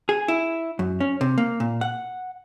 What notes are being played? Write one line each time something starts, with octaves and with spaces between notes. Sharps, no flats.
G#4
E4
F#2
C#4
C3
A#3
A#2
F#5